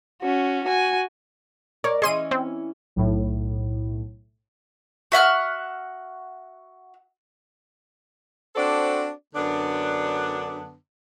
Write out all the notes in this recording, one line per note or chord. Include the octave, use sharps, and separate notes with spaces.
C#4 F#4
F#4 G#5
A#4 C#5 D5
E3 C#4 G#4 D#5 C6 D#7
C4
B1 A2
F#4 E5 F#5 F6
C4 D4 F#4 A4 C5 D5
F#2 D3 B3 D4